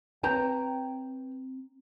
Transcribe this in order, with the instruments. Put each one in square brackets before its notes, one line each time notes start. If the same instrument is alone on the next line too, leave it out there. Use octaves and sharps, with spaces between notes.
[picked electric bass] C4 D4 [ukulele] B4 C#5 A#5 [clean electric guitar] G5